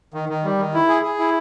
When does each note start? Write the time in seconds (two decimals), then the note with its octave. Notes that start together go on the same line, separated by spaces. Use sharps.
0.14 D#3
0.29 D#3
0.44 G3
0.59 D#3
0.74 E4
0.89 G#4
1.03 G#4
1.19 E4